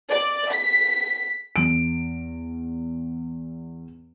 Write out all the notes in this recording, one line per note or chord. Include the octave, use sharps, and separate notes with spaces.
D5
B6
E2 D7